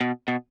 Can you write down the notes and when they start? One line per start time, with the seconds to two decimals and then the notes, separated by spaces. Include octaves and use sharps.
0.01 B2
0.28 B2